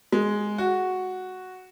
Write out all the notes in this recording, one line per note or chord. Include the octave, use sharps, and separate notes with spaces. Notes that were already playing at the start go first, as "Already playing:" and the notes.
G#3
F#4